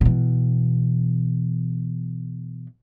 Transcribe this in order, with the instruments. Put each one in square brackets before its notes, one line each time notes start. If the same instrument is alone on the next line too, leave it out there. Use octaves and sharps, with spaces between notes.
[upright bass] B2 E3